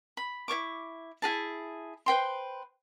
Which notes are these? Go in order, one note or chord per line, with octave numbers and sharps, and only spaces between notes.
B5
E4 C#5 C#6 D6
E4 F#4 G#4 A5
B4 C5 G5 C6